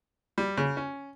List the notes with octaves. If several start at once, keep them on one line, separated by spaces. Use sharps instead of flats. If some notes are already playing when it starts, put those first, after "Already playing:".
G3
C#3
C#4